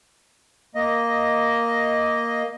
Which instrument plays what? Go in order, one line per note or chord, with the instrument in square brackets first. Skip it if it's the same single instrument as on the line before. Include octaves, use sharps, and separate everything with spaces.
[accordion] A#3 D#5